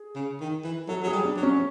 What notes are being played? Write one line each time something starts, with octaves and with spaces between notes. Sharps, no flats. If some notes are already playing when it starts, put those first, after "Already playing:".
Already playing: G#4
C#3
D#3
E3
F#3 A4
F#3 G#4
G3
D4
F#3
C#4